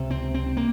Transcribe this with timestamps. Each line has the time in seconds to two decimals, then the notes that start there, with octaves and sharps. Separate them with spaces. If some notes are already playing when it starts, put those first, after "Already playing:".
Already playing: C#2 C3
0.11 C4
0.34 C4
0.57 A#3